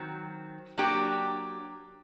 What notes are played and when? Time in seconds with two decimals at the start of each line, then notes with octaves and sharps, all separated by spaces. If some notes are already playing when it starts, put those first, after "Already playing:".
Already playing: D#3 F#3 C4
0.78 F#3 A#3 D4 G4